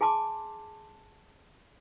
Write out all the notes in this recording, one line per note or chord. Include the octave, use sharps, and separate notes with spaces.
G#4 G#5 A5 C6 D6